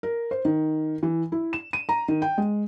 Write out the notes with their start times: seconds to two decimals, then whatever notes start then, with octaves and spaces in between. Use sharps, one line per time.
0.03 A#4
0.31 C5
0.45 D#3
1.03 E3
1.32 E4
1.53 E7
1.73 D#7
1.89 A#5
2.08 D#3
2.22 G5
2.38 G#3